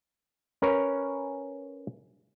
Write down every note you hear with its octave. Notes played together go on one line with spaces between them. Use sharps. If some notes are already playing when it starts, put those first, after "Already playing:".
C#4 A#4 B4 C#5